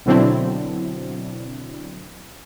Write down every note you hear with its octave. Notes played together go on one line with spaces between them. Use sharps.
B2 D3 F#3 C4 D4 E4